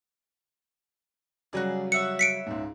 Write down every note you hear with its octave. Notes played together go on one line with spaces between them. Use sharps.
C#3 F#3 G3 F#4 G#4 D5
C#5 E5 F#5 C#7
B6 C#7 D7
C#2 G#2